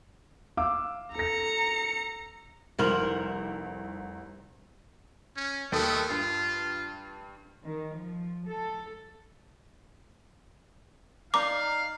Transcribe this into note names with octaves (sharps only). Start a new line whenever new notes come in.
F5 D6 E6
A4 A#5 A#6 C#7
F1 C2 C3 A#4 C5 F#7
C#4
D#2 A3 A4 D#6
G2 F4
D#3
F3
A4
D#4 D5 F5 A#5 D6